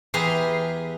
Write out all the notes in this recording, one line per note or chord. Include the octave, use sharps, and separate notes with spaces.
E2 G4 G#4 B4 A#5 C6